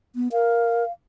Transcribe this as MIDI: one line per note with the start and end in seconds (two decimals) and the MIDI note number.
0.16 0.28 59
0.32 0.84 70
0.32 0.92 77